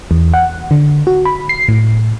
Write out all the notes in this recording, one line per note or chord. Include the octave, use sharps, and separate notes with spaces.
E2
F#5
D3
F#4
B5
C7
A2